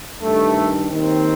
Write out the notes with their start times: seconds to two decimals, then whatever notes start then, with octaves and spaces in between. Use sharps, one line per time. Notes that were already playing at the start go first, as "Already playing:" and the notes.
0.21 G2 D#3 A3
0.89 D#2 D#3 C4